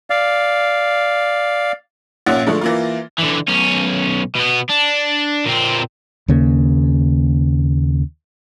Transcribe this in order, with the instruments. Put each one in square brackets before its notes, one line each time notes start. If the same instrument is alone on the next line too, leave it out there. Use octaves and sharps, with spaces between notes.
[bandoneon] D5 F5
[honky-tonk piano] A#1 A#2 C#4 F#5 A6
D3 F3 G#3 A3
E3 A#3 F4
[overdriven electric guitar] D3 E3
B1 C#4
B2 B3
D4
A#2 C4
[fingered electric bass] D#2 C#3 A#3